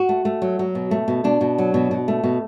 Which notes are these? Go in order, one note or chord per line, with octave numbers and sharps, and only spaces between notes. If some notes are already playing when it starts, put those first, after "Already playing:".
Already playing: F#4
A3
A3
F#3
F#3
B2
A3
B2
B2 D4
B2
F#3
B2
B2
A3
B2